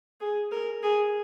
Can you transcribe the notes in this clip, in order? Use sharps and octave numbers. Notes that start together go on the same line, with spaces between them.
G#4
A#4
G#4